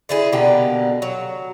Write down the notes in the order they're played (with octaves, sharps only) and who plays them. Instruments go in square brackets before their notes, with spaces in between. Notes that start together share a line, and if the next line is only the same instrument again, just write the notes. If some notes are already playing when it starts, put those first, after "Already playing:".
[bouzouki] D3 E4 G#4
B2 D3 A#3 G4
F#3